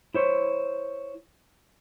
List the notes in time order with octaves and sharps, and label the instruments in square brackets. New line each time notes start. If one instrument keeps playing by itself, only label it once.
[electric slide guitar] E4 C5 C#5